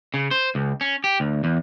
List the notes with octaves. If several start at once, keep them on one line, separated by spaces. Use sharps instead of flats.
C#3
C5
C#2
C#4
G4
D2
E2